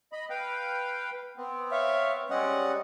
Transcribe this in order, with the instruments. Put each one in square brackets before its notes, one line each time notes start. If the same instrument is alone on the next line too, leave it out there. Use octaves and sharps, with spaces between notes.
[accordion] D#5 B5
B4 F5 G5
B3 C4
[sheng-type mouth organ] C#5 E5 F5
[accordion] G3 G#3 C4 [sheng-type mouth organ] C#4 D#5 F#5